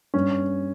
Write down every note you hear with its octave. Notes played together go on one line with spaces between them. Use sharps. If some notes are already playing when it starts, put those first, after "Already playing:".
G2 C#4